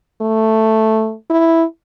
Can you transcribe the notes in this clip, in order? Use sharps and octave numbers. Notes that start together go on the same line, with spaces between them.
A3
E4